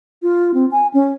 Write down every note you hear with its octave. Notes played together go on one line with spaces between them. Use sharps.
F4
C4
G#5
C#4